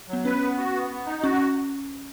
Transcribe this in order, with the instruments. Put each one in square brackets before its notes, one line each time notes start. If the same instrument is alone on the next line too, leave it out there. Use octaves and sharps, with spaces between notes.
[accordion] F#3 [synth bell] B3
[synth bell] C#4 [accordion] B4
[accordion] B3
F#4
B3
B3
D#4
[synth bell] C#4 [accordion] F#4